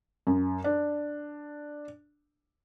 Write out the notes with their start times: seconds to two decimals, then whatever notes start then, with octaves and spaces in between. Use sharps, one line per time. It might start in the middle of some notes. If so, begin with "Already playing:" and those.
0.27 F#2
0.64 D4